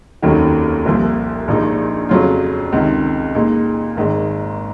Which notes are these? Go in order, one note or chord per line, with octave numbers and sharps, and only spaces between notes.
F1 D#2 D#3 F#3 C#4
C2 A#2 F3
A#1 A#2 F3 G#3 D#4
F2 C#3 F#3 C#4 F4
C#2 C3 D#3
A#2 G#3 D#4
G#1 G#2 D#3 G#3